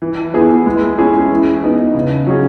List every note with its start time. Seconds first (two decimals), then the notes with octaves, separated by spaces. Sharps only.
0.02 E3
0.34 B3 E4 G#4
0.66 G#3
0.98 C#4 E4 G#4
1.31 E3
1.63 B3 D#4
1.95 C#3
2.27 F#3 C#4 G#4